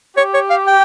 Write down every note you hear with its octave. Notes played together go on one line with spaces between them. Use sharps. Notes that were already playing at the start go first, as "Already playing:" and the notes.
G4 C#5
C#5
F5
G5